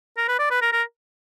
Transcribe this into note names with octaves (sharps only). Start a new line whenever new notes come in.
A#4
B4
D5
B4
A#4
A#4